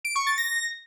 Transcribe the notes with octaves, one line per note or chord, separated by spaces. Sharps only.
D7
C#6
A6
A#6